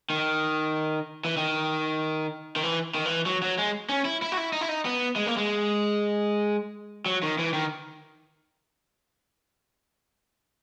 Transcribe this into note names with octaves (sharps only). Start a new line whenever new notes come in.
D#3
E3
D#3
D#3
E3
D#3
E3
F#3
F#3
G#3
C#4
E4
E4
F#4
E4
D#4
E4
D#4
B3
G#3
A#3
G#3
F#3
D#3
E3
D#3